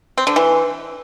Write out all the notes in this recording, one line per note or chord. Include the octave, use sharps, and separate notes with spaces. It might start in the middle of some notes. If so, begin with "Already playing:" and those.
C4
D3
E3